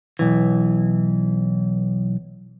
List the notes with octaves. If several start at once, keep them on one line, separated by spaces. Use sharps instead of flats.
B1 E3